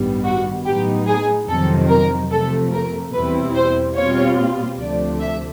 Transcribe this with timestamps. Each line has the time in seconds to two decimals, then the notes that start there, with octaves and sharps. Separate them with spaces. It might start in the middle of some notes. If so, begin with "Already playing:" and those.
Already playing: A1 G2 D#3 G3 B3
0.24 F#4
0.65 A2 F#3 B3 D#4 G4
1.07 G#4
1.48 F2 C3 D#3 F#3 A4
1.89 A#4
2.30 F2 C3 F3 A3 A4
2.72 A#4
3.13 E2 B2 G3 C4 E4 B4
3.55 C5
3.96 B2 G3 C4 F4 C#5
4.78 D2 C3 F3 A3 D4 D5
5.19 E5